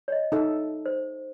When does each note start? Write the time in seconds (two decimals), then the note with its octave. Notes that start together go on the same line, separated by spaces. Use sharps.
0.08 C#5 D#5
0.32 D#4 A4 E5
0.86 C5